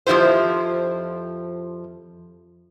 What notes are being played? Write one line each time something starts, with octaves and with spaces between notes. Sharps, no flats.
F2 F3 C4 E4 G4 C5